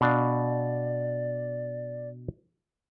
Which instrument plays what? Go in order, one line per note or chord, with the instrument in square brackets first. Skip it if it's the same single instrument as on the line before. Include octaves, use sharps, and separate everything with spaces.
[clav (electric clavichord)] B2 D4 F5 [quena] D5